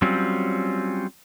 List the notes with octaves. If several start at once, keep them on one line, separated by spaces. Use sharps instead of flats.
F#3 G3 C4 C#4 F4